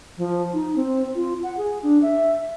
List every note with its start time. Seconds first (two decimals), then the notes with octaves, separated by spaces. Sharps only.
0.18 F3
0.53 D#4
0.76 C4
1.15 F4
1.43 F#5
1.57 G#4
1.83 D4
2.02 E5